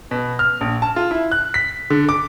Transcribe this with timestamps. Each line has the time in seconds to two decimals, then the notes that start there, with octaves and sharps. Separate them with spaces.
0.11 B2
0.39 F6
0.61 A#1
0.82 A5
0.96 F4
1.11 E4
1.31 F#6
1.54 B6
1.90 D3
2.09 D6